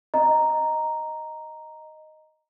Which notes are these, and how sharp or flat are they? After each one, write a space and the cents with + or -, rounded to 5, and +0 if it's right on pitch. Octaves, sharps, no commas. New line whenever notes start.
D#5 +0 A#5 +0